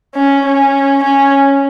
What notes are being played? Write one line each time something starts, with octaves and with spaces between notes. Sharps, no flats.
C#4
C#4
C#4